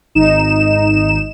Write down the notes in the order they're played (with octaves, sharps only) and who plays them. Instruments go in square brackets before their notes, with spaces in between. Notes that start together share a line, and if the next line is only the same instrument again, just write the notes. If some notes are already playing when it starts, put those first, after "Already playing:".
[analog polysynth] G#1 D#4 E7